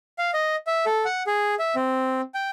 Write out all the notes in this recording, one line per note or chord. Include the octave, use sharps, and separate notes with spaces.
F5
D#5
E5
A4
F#5
G#4
E5
C4
G5